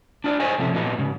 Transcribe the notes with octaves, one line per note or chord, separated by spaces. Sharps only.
D4 F4 D5
G#4 C5 C#5 D#5 G#5
A2 C3 F3 A3 C#4
A#2 F#3 B3 D#4 F4
G#2 C#3